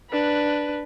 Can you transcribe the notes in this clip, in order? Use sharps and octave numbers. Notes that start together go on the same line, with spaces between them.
D4 B4